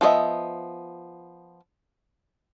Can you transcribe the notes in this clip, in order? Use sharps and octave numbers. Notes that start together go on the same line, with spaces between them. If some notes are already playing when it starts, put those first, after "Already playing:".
F3 B3 G#4 D#5 E5